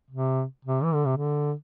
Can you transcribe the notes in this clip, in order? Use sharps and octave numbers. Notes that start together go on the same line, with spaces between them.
C3
C3
E3
D3
C3
D3